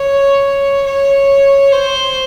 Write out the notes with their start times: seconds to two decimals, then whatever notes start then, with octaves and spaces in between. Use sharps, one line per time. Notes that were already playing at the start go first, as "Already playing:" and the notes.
Already playing: C#5
0.86 C#5
1.72 C5